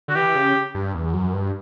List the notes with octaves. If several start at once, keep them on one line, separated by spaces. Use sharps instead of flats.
D3 F#4
E3 G4
C#3
G2
E2
F#2
G2